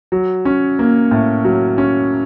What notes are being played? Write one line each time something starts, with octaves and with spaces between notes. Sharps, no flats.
F#3
C#4
A#3
A2
F#3
C#4